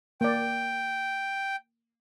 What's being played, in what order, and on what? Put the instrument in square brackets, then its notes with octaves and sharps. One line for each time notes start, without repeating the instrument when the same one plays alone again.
[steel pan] A#3 D5 [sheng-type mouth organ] G5